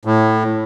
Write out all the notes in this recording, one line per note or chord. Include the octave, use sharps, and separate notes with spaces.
A2